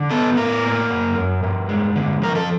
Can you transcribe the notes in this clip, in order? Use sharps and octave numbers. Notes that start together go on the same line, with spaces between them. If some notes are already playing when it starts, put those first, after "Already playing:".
Already playing: D3
B3 A4
A2 A#4
A#3
F#2
F#2
G2
G#3
D3
F3 A#4
A4